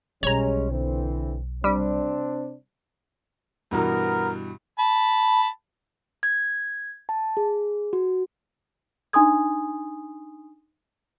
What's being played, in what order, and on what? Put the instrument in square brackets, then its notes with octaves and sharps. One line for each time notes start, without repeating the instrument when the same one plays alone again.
[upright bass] B1 [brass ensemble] G3 G#3 C#4 [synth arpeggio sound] C#5 A#5
[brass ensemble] D3 E3 C4
[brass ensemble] C3 C4 D4 [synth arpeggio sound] G3
[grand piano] G2 B2 E3 [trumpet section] B3 A#4
[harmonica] A5 B5
[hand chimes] G#6
A5
G#4
F#4
[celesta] D4 D#4 G#5 C6 D#6 G#6